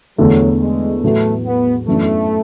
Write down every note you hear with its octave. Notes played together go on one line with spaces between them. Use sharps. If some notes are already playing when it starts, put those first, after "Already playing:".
E2 D3 F#3 A3
G#3
A2 F#3 A3 B3
B3
F#2 E3 A3 B3 D4